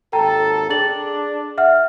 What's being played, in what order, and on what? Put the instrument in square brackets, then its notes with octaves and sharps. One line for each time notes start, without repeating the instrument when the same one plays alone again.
[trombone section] G#1 D#2 A4 [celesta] G5 A#5
[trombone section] D4 [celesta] G#4 A6 F#7
[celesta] E5 F#5 F6